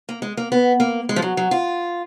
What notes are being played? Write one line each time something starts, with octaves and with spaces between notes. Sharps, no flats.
A#3
G#3
A#3
B3
A#3
G#3
F3
F#3
F#3
F4